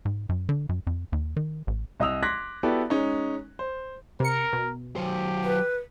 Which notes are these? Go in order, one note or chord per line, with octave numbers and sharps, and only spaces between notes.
G#2
F#2
D3
F#2
F2
D#2
D#3
A1
C2 D#5 D#6 E6 F7
C6 D6 F#6 G#6 A#6 B6
B3 E4 F#4 G4 A4 D5
G#3 C#4 D#4
C5
C3 A#4 C#7
B2
F#3 G4 C5
B4